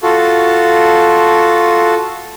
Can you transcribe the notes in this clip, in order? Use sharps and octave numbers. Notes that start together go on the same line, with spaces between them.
F4 F#4 A4